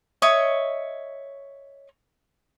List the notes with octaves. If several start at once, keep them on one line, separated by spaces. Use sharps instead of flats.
C#5 D#5 E5 C#6